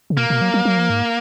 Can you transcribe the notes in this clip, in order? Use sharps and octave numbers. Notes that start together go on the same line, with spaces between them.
C#3
B2 A#3
B2
F#3
F#3
F#3
F3
G#2